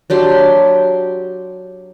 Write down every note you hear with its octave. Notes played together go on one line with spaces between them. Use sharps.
F#3 D4 G4 C6